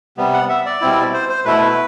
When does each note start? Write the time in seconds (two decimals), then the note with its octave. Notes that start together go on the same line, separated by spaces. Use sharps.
0.18 C3 G3 B3
0.33 F#5
0.49 E5
0.66 D5
0.81 B2 G3 C4 E4
1.13 C5
1.29 C5
1.45 B2 A3 E4 B4
1.61 B4